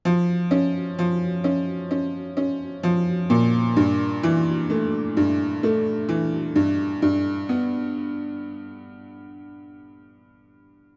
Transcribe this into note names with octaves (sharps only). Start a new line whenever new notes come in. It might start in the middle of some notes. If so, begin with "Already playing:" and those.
F3
C#4
F3
C#4
C#4
C#4
F3
A#2
G2
E3
A3
G2
A3
E3
G2
G2
B3